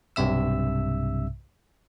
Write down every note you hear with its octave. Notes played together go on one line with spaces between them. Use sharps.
B1 G2 C3 E5 E6